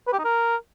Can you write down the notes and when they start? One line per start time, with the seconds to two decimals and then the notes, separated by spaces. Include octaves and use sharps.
0.07 B4
0.13 G4
0.19 D#4
0.24 A#4